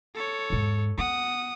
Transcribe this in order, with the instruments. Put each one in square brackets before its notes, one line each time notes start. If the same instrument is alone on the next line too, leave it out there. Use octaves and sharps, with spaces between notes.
[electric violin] A4 C#5
[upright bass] E2 G#2
[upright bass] B3 [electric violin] F#5 D#6